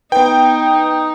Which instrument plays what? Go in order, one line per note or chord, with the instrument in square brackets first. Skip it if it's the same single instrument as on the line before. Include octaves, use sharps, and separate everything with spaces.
[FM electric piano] B3 B4 [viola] D#4 [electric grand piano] G5